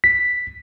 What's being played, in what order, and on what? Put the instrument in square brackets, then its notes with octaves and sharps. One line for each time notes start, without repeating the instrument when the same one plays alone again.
[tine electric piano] B6